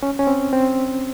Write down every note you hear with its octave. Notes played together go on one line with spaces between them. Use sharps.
C#4
C#4
C4
C4